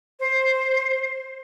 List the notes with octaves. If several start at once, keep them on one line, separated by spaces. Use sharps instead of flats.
C5